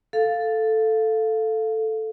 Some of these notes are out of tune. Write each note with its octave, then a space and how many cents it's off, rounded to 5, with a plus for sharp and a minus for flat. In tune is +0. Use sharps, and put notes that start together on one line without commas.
A4 +0 F5 +0